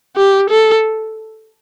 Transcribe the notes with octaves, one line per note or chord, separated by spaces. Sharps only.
G4
A4